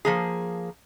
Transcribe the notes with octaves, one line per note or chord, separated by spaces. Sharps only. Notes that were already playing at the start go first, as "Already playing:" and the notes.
F3 A#3 G#4